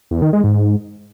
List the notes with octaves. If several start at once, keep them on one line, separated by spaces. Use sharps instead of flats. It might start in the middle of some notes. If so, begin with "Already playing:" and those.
E2
D#3
G#3
G#2